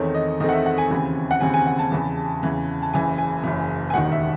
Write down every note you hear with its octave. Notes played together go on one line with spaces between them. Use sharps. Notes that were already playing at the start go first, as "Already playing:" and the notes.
Already playing: E2 D#3 A3 C4 C#5
D#5
E2 D#3 A3 C4 D#5
F#5
E5
F#5
G#5
D#2 C#3 E3 C4
F#5
D#2 C#3 E3 C4 G#5
G#5
F#5
A5
E2 C#3 E3
E2 C#3 E3
A5
F#1 F#2 C#3 E3 G#5
G#5
F#1 F#2 C#3 E3
G#5
E1 D#2 D#3 F#5
E5